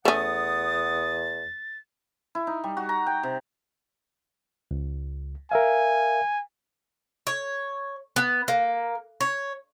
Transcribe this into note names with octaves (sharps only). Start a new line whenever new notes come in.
E2 A3 C#4 F#5 D#6 A6
E4
D#4
G3
F#4
A#5
G5
C3
C#2
A#4 E5 F5 G#5
C#5
B3
A#3
C#5